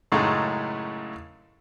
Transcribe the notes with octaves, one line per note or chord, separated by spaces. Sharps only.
F#2 A2 C#3 G#3 A3 D#4